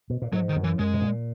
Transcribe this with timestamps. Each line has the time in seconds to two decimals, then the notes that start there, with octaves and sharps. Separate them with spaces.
0.10 B2
0.22 A#2
0.33 G#2 F#3
0.49 D#3
0.56 F#2
0.64 E3
0.79 F#2 G#3
0.94 B2
1.02 A#2